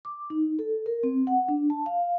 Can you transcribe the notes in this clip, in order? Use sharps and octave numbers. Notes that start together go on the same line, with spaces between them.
D6
D#4
A4
A#4
C4
F#5
D4
A5
F5